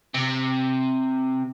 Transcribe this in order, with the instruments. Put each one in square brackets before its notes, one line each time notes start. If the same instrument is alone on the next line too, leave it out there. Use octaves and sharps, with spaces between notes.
[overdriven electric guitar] C3